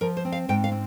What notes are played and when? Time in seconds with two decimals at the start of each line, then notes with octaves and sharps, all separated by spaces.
0.01 F3 A#4
0.17 C5
0.25 C4
0.32 F5
0.49 G#2 G5
0.64 F5
0.72 C4